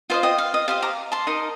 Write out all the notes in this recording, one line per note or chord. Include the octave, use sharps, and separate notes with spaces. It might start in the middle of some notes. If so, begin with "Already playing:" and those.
F4 C5 D#5 F5
D#5 G5
F5
D#5
G4 C5 D#5 F5
A#5 D6
A5 C6
D#4 A#4 D#5